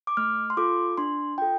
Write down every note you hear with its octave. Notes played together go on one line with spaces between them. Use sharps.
D6
A3 F6
C6
F4 A4 D6
D4 C6
F4 A4 G5